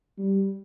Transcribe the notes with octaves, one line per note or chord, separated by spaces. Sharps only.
G3